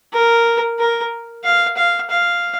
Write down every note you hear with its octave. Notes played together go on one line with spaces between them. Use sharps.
A#4
A#4
F5
F5
F5